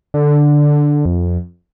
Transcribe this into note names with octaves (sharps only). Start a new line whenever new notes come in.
D3
F2